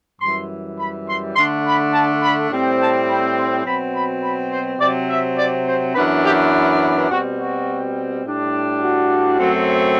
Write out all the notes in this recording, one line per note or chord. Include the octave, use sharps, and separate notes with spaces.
F#2 E3 G3 C6
B5
C6
D3 A3 D4 C6
B5
A5
B5
A2 G3 C4
A5
B5
C6
B2 F#3 C4 B5
B5
B5
C5
C3 F#3 C4 D5
E5
D5
C5
F#2 E3 B3 D4 B4
G4
B2 G3 C4 F#4
F#4
A2 G3 D4
F#4
F#2 F#3 A3 C4